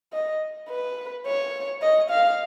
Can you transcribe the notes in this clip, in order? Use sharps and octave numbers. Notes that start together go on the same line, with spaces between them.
D#5
B4
C#5
D#5
F5